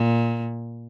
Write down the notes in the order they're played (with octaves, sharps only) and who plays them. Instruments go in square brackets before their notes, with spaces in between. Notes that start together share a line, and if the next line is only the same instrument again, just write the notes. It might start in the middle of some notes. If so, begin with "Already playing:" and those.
Already playing: [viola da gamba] A#2